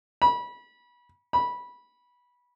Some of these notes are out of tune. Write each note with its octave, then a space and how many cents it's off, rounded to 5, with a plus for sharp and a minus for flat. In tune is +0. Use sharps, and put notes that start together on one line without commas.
B5 -25
B5 -15